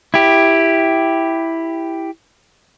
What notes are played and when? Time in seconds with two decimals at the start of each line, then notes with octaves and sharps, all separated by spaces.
0.14 E4 G4